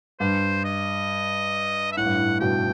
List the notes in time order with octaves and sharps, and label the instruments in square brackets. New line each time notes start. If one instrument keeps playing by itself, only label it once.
[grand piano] G2 [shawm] C5
[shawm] D#5
E5
[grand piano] A2 [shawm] F#5
[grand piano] G2
A2
[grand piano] G2 B2 [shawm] G5